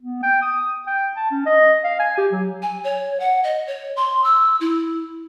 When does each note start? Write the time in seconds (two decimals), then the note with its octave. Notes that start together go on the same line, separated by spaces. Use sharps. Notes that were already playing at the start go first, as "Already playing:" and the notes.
0.02 B3
0.23 G5
0.42 D#6
0.87 G5
1.16 A5
1.31 C#4
1.46 D#5
1.84 F5
1.99 G#5
2.18 G4
2.32 F#3
2.62 G#5
2.84 C#5
3.20 F#5
3.44 D#5
3.67 C#5
3.96 C6
4.24 E6
4.61 E4